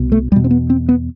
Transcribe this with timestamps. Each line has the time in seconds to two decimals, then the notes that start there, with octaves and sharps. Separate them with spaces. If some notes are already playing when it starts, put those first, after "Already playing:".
Already playing: C2 B2
0.12 A3
0.31 E2 G3
0.36 B2
0.44 C4
0.51 B3
0.70 C4
0.89 B3